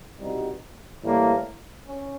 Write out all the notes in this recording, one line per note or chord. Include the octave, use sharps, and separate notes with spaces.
C2 B2 G3 B3 D#4
A2 E3 G3 A#3
C#4